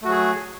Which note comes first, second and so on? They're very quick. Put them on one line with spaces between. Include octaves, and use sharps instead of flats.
A3 F#4 F#3 G#4